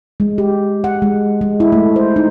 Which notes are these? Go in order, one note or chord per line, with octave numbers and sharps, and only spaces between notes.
G#3
G4
F#5
G#3
G#3
E4
A3
C5
D#4